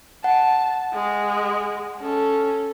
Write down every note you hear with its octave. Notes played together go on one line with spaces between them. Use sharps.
F#5 A5
G#3
C#4 A4